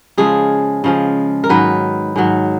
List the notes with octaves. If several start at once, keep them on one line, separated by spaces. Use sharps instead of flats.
C#3 F3 G#3 G#4
C#3 F3 G#3
A#4
G#2 D#3 F#3 B4
G#2 D#3 F#3